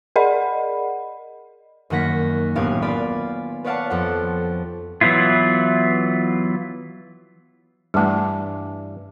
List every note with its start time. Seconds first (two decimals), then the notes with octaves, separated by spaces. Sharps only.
0.16 G#4 A#4 D5 D#5 F#5 B5
1.90 F#2 D#3 A#3 F#5 A#6 B6
2.55 D#1 A1 B3 G4 F5 G#5
2.82 F4 D5 F5 G#5 B5
3.64 B4 C#5 D5 F5 F#5 A5
3.90 F2 A4 F#5
5.01 E3 F#3 B3 E4 F4
7.94 G2 E3 G3 A3 D4